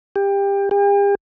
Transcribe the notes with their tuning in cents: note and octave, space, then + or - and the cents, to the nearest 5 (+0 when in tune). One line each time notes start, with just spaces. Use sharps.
G4 +25
G4 +45